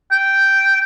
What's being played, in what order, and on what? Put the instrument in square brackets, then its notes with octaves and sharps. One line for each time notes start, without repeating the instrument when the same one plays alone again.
[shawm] G5